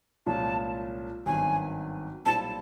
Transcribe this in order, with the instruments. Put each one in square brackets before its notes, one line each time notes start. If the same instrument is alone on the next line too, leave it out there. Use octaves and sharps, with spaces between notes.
[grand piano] C2 A#2 F3 G#3 C#4 [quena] A5
[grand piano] G#1 G2 D#3 F#3 B3 [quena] G#5
[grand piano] B1 A#2 G3 C4 E4 [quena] A5